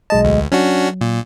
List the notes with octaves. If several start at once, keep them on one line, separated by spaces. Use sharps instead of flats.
B1 G#3 D#5 A5
D2
F#3 C#4 D4 F#4
A#2